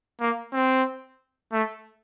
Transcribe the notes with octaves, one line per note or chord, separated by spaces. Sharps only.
A#3
C4
A3